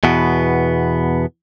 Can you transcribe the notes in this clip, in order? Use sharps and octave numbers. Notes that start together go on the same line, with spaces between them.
E2 B2 B3